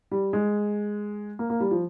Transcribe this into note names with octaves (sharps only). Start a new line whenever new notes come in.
G3
G#3
A#3
A#3
G3
F3